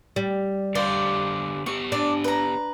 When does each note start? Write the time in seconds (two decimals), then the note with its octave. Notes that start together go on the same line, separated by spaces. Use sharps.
0.16 G3
0.75 D3 G4 C5 D5 F5
1.66 B3 G4 C#6
1.92 D4 D5
2.24 B4 A#5